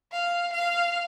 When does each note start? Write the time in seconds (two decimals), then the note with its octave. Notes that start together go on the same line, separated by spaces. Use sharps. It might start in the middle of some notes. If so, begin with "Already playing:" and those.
0.12 F5
0.53 F5